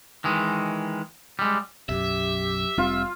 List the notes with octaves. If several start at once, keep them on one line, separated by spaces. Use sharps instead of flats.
D#3 E3 G#3
G3 G#3
B1 F#2 G4 E5
F1 G3 C4 F4